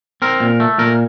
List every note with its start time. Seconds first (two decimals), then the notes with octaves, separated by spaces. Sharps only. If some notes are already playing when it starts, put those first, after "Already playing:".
0.22 C4 A#4
0.40 A#2
0.60 A3
0.78 A#2 A#4